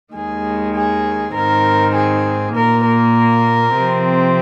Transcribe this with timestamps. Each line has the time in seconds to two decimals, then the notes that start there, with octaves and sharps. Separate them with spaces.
0.14 D#2 D#3 G#3 G#4
0.74 G#4
1.35 G#2 D#3 C4 A#4
1.94 G#4
2.55 A#2 A#3 A#4
2.85 A#4
3.75 C3 F3 C4